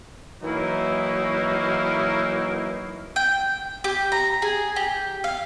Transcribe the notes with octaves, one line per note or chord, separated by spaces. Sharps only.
E3 F#3 A#3 D#4 E4
G5
G4
A#5
G#4
G4
F5